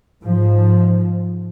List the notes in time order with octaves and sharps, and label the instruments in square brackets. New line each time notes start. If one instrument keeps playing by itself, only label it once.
[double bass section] G#2 F3